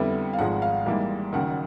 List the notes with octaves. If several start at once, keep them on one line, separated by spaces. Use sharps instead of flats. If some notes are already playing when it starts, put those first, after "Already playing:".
Already playing: F2 D3 G3 B3 E4
F5
G#1 G#2 F3 G#3 F#5
F5
G#2 E3 G3 A#3
F#1 F#2 D#3 F#5